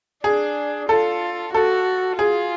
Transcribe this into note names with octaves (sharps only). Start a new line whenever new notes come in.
D4 G#4
F4 A4
F#4 A4
F4 G#4